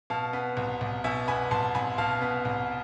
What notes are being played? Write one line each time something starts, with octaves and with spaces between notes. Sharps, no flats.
B2 F5 A5
B3
C2
C2
B2 E5 G#5
B3 G#5 B5
C2 A5 C6
C2 G#5 B5
B2 F5 A5
B3
C2